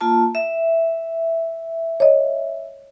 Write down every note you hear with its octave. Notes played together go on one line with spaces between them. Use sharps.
A#3 F4 A5
E5
C#5 D#5